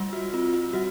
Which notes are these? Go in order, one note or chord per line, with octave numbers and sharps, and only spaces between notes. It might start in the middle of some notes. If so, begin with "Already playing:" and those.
Already playing: G3 F4
F#4
C4 F4
F4
G3 F#4